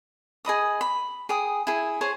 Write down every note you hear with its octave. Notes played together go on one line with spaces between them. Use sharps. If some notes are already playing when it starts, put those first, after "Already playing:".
G#4 D#5 B5 D#6
B5
G#4 G5 D#6
E4 G#4
G#4 C5 C#5 G#5